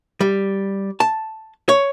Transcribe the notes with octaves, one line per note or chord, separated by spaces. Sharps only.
G3
A5
C#5